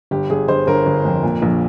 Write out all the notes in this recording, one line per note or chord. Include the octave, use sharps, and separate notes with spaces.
G1 G4
G1 G#4
G1 C5
G1 A#4
G1
F2
A#2
A#1